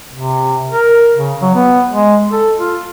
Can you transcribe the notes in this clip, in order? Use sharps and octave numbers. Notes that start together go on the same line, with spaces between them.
C3
A#4
C#3
F#3
B3
G#3
A4
F4